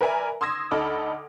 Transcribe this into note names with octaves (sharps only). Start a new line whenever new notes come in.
A#4 B4 D5 E5 G#5 A#5
C6 D#6 E6 G#6 A#6
D2 D#4 A4 B5 D6 F6